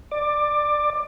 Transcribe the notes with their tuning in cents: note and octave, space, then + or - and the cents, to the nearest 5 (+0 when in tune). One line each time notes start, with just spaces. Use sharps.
D5 +15